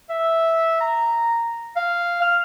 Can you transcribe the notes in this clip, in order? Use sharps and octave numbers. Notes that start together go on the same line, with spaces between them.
E5
A#5
F5
F6